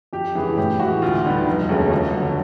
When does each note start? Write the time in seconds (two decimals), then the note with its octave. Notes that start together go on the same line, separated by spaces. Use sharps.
0.13 F2 G4
0.35 C#3 E3 G#3 B3 G#4
0.57 A2 G4
0.80 E3 G#3 F#4
1.02 D2 F4
1.24 D3 G3 B3 D#4
1.47 F1
1.69 D#2 C#3 F#3 A3
1.92 F2
2.14 D3 F#3